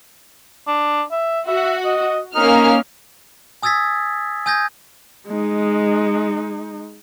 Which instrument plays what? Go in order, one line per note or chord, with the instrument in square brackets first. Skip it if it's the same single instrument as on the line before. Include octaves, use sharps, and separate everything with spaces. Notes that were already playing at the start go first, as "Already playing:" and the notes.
[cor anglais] D4
E5
[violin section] F#4 [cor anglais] E5
[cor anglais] D#5
[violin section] A#3 C#4 F6 [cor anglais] D#4
[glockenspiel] G#5 D#6 E6 G#6 A6 B6
G#5 D#6 G6 G#6 A#6
[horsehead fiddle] G#3 D#4